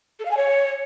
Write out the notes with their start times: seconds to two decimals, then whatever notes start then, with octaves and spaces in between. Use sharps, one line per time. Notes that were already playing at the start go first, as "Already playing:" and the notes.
0.19 A4
0.25 F5
0.30 G#5
0.36 C#5